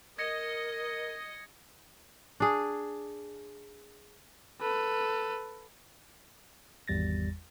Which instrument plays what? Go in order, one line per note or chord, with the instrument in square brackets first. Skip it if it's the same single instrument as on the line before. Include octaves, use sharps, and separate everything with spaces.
[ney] A#4 [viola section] D#5 [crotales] G#6 A#6 C#7
[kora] D4 G#4
[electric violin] A4 B4
[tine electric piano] G#1 E2 G3 A6 A#6